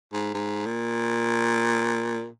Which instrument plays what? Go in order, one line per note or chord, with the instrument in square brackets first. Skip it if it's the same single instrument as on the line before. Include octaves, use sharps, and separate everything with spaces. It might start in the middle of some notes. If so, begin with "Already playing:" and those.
[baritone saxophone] G#2
G#2
A#2